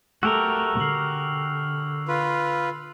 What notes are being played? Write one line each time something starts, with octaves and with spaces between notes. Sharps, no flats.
A3 F#4 G4 A#4 E6 F7
D3 F6 C7 F#7
F4 B4